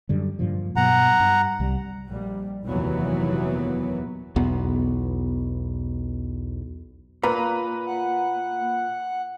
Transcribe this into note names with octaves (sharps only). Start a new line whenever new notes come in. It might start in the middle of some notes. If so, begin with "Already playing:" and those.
F#2 D3 G3
G2 A#2 F3
G2 B2 F#3 F#5 A#5
G2
C2 G3
A#1 G3
F1 D#2 A#2 E3 F#3 B3
B1 E2 B3
A#2 A#3 B4 A#5
F#5